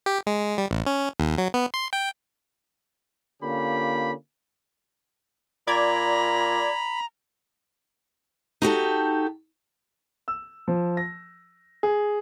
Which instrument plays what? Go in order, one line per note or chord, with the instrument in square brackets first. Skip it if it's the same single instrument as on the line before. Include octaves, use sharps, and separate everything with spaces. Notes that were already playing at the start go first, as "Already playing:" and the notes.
[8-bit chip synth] G4
G#3
G3
A1
C#4
D#2
F#3
B3
C6
G5
[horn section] D3 A#3 C#4 F4 G4 B5
[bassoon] A#2 [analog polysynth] D5 D6 G#6 [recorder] A#5 [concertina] B5
[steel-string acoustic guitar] D#4 F#4 G4 A4
[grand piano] E6
F3
A#6
G#4